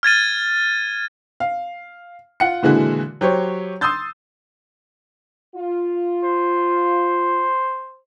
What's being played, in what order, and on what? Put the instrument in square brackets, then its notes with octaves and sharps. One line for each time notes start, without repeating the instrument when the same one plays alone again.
[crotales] F6 G#6 A6 D#7
[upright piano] F5
F4 F#5 C#7
A#2 D3 E3 G#3 E4 F#4
F#3 G4 C5 C#5
C6 D#6 E6 G6 A6
[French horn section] F4
[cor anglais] C5